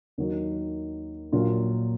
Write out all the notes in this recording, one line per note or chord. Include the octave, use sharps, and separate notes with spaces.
D#2 D#3 F#3 A#3
A#1 A#2 F#3 A#3 F4